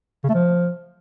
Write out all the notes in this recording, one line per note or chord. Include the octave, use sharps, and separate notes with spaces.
C#3
A3
F3